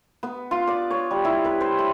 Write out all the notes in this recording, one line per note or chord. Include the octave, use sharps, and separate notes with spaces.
B3
F4
D5
C#5
G3
E4
B4
C5
B5